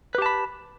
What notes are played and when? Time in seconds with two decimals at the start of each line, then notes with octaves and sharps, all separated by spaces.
0.15 B4
0.18 G4
0.22 A5
0.26 B5